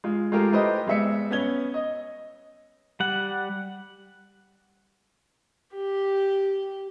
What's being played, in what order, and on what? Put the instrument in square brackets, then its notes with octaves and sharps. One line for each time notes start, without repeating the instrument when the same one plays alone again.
[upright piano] G#3 F4
G#3 A3 F4 G4 A#4
A3 E4 G4 B4 C5 D#5
G3 G#3 B3 E5 E6 C#7
B3 C#4 G#6 G7
D#5
[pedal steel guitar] G3 F#5
[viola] G4